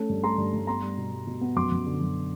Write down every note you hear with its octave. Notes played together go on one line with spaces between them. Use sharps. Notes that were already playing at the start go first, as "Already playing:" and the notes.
Already playing: A3 C#4
G2
A3 A#5 C6
G2
G2
B3 A#5 C6
G3
B2
G3
B2
B3
F#2 C6 D6
F#2
D3
F#2